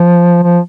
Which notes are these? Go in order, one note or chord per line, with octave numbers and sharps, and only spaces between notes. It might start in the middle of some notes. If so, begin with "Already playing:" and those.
Already playing: F3
F3